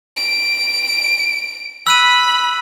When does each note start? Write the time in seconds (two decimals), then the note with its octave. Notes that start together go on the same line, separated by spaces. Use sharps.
0.17 D7
1.87 B5 E6 F#6 D#7